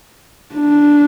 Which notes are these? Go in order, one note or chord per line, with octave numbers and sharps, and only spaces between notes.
D4